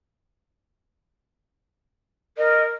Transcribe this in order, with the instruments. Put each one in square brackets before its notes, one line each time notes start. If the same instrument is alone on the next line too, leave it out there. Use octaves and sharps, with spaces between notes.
[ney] A#4 [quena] D#5